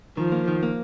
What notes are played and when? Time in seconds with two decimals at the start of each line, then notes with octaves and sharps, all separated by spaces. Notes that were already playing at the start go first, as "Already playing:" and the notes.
0.17 D#3 F3
0.32 A#3
0.48 D#3
0.63 A#3